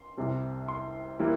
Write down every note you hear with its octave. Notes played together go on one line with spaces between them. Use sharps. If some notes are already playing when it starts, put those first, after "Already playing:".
Already playing: C6
C2 C3 G3
C6
E3 G3 A#3 E4